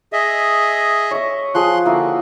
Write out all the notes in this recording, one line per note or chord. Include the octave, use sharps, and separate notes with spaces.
G#4 D#5 E5
C#5 D#6
F3 G#4 C6 D#6 F#6
D3 A#3 E4 F#4